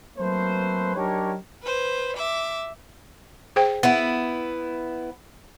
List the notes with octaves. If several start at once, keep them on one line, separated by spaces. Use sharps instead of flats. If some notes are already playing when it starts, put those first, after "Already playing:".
F#3 A3 A#3 C4 B4 C5
F#3 D4 D#4 G4 A#4 C#5
B4 C5
E5 D6
G#4 C5 G5
B3 E4 F#5